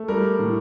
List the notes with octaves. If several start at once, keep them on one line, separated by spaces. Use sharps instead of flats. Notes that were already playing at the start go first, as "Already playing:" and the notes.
Already playing: A3
G3 A#4
A2